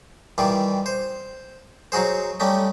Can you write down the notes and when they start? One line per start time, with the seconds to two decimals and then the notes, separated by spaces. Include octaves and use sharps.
0.38 D#3 E3 G3 F4
0.86 C5
1.92 F#3 D#4 F#4 G#4 C5
2.40 G3 A3 C#4 D#4